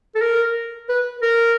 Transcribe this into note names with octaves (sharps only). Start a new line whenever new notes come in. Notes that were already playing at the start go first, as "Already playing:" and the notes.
A4
A#4
B4
A#4